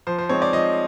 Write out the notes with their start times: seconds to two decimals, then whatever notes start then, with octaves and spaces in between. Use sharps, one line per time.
0.07 F3 C5
0.19 C5
0.29 G#3 C4 D#4 C#5
0.42 D5
0.53 F3 D#5